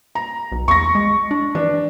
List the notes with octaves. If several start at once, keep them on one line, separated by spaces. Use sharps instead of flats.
A#5
B1
E2 C#6 A#6
G#3
D4
E3 D4